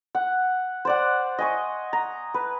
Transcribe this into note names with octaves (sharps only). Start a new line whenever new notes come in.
F#5
C5 D5 F#5
D#5 G#5 C#6
A#5
B4